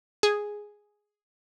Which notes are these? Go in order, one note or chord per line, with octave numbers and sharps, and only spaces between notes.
G#4